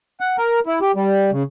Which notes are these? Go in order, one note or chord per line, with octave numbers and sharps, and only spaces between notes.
F#5
A#4
E4
G4
G3
C#3